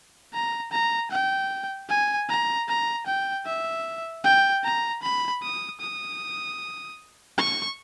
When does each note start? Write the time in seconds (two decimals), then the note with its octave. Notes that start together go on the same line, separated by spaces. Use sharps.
0.33 A#5
0.72 A#5
1.11 G5
1.89 G#5
2.29 A#5
2.68 A#5
3.07 G5
3.46 E5
4.24 G5
4.64 A#5
5.03 B5
5.42 D#6
5.80 D#6
7.38 C#6